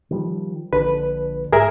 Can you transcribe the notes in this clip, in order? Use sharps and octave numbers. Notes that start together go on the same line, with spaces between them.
D#3 F3 G3
A#1 D3 D4 B4
G#2 G#4 A#4 E5